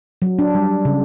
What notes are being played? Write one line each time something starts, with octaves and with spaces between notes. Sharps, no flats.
F#3
D4
G3
C#3